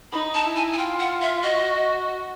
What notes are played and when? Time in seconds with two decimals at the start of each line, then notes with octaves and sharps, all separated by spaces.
0.12 D#4 B5
0.35 A5
0.46 E4
0.56 G#5
0.73 G#5
0.78 F4 G5
1.00 F#5
1.22 E5
1.43 F#4 D#5